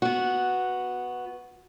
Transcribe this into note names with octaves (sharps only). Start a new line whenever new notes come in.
B3 F#4